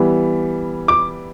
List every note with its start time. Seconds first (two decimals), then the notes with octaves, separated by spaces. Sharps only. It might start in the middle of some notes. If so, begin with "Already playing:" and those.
Already playing: E3 G3 B3
0.88 D6